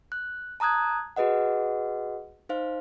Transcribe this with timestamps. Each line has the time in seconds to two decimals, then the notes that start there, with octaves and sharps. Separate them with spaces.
0.12 F#6
0.60 A5 A#5 D#6 F#6 G#6
1.16 F#4 G#4 B4 D#5 F#5
2.49 D#4 C5 F5